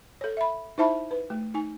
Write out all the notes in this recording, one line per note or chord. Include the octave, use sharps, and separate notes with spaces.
A4 C#5
E5 B5
D#4 E4 C5 E5 A5 B5
B4
A3
D#4 G#5